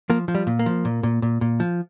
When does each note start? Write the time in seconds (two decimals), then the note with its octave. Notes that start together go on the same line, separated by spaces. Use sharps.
0.10 F3 A#3
0.28 F3
0.35 G3
0.47 A#2
0.59 A#3
0.66 F3
0.85 A#2
1.03 A#2
1.22 A#2
1.41 A#2
1.60 F3